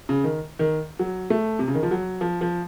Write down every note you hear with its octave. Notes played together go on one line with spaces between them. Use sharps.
C#3
D#3
D#3
F#3
A3
C3
C#3
D#3
F3
F#3
F3
F3